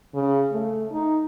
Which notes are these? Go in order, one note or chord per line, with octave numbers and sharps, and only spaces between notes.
C#3
A3
D#4